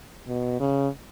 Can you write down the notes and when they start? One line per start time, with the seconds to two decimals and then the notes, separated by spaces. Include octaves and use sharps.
0.28 B2
0.60 C#3